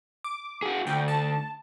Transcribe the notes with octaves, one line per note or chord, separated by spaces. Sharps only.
D6
F#4 G#4
D2 G5
A5